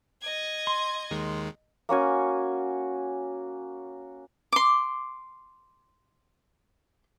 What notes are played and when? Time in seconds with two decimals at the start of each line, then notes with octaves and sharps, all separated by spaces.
0.22 D#5 G#6
0.67 C6
1.11 D#2 D#3 G#3
1.89 A#3 C#4 F#4 G#5
4.52 C6 D6